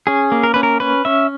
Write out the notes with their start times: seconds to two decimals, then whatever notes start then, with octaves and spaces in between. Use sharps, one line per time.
0.07 C#4 G#4
0.32 A#3
0.43 A#4
0.54 C#4 B4
0.63 A#4
0.80 C#4 B4
1.05 C#4 E5